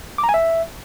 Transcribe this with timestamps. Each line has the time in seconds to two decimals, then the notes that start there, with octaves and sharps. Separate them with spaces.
0.18 D6
0.24 A#5
0.29 G#5
0.34 E5